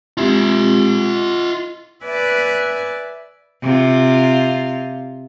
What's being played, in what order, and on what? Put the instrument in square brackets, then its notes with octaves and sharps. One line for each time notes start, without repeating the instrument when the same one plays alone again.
[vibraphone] G#3 C4 G4 [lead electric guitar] F4 E5
[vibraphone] D#5
[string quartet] B4 D5 E5 G#5 F#6
[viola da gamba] C3 F4